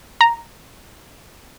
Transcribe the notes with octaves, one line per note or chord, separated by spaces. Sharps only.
A#5